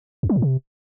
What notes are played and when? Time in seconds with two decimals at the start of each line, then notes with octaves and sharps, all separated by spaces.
0.23 E2
0.30 F#3
0.36 A2
0.42 C3